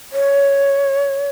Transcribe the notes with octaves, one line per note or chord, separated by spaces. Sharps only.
C#5